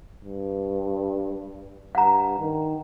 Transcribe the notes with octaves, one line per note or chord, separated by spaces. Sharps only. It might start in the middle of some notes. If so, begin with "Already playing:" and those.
G2
G2 F#5 A#5
D#3